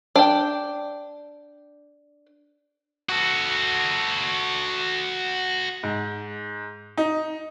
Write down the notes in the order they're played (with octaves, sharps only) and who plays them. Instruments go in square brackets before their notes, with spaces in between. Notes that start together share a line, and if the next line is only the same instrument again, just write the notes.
[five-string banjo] D4 G5
[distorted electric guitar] F#4 A4
[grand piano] G#2
D#4